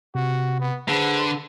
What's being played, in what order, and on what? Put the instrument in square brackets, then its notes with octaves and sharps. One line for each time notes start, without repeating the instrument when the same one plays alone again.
[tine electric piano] C3 [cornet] F#4
[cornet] B3
[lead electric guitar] D3 [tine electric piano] G#4 C5 [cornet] B4